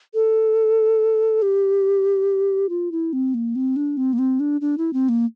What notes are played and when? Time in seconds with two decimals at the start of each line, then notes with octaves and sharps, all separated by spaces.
0.14 A4
1.42 G4
2.69 F4
2.92 E4
3.13 C4
3.34 A#3
3.56 C4
3.76 D4
3.97 C4
4.13 A#3
4.19 C4
4.40 D4
4.61 D4
4.78 E4
4.93 C4
5.09 A#3